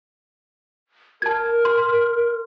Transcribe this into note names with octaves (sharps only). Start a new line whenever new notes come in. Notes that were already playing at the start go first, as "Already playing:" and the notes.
A#4 A5 G#6
C6